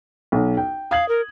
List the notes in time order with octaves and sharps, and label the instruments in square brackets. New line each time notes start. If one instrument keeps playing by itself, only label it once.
[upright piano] B1
G5
[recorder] F5 [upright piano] D#6 G#6 F#7
[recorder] A#4